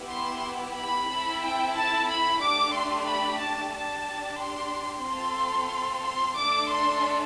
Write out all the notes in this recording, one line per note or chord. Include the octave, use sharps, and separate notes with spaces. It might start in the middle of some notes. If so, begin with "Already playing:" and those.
Already playing: B3 E4 G4
C6
B5
C4 E4 A4
G5
A5
B5
A3 D4 G4 D6
C6
B5
A5
D4 G4 A5
C6
C4 F4 A4 C6
C6
A3 D4 A4 D6
C6